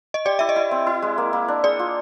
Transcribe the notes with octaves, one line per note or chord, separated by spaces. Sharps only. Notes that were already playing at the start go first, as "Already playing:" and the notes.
D#5
G4 D5
E4 E5
D#5
E4
C4
E4
G#3
A#3
A#3
D4
G#4 D5
F4